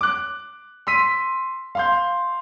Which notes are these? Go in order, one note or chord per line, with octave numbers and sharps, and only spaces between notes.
D6 F#6
C6 E6 B6 D#7
F5 C6 G6